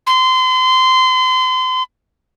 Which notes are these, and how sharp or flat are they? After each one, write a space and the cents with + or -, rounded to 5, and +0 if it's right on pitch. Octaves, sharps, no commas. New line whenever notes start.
C6 -35